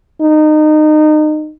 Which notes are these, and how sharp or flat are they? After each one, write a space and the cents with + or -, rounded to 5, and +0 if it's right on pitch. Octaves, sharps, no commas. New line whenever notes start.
D#4 -25